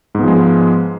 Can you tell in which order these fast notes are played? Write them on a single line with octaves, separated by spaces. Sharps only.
G#2 B3 F3 G#3